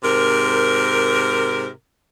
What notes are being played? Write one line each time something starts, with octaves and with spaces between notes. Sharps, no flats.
G#2 C3 A#4